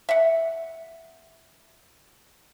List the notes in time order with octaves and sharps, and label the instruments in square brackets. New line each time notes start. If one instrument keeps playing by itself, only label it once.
[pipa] E5 F#5